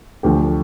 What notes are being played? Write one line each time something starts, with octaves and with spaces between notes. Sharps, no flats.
D2 D3 F3 G4